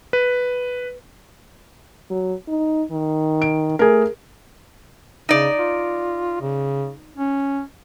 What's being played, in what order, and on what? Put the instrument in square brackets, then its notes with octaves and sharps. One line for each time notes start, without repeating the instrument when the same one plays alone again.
[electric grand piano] B4
[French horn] F#3
D#4
D#3
[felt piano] D7
[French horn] A3 [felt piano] G#4 A#4
[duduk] C#3 [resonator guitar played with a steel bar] D#4 D5
[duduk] F4
C#3
C#4